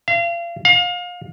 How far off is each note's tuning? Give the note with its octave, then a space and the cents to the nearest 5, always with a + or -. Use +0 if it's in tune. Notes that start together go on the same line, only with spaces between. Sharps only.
F5 -35
F5 +30